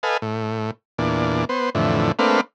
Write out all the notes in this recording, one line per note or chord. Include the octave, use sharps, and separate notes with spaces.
A4 B4 D#5 F5 G#5
A2
E2 A#2 D4
B3 C5
F2 A2 D3 E3
A3 A#3 C4 D4 B4 F5